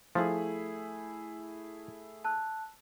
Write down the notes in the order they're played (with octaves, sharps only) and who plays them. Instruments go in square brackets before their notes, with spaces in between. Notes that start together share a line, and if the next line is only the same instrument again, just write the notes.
[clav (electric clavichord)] F3 [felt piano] A3 E4 G#4
[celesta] A5 E6 F#6